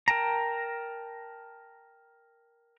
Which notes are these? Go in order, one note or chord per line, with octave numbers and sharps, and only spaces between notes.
A#4 G5 A5 A#5